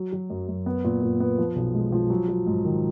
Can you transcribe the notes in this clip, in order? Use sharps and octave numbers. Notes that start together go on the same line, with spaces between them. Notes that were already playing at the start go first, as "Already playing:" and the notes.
Already playing: F#3
F#3
F#2
F#2
B3
A#2
A#2
B3
F3
B1
G#3
F3
F#3
F#3
G#2
D#3